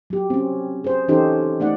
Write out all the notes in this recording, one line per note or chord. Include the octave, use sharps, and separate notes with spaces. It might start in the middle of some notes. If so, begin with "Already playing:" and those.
F#3 G4
C4 C#4
G#4 C5
E3 C#4 D#4 G4 A4 C5
A3 D#4 D5 F#5